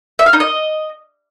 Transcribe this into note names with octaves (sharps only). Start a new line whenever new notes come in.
E5
F5
D#4
D#5